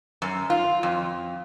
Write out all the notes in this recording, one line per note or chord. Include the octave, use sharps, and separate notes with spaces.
F#2
F4
F2